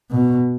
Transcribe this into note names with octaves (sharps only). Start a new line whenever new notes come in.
B2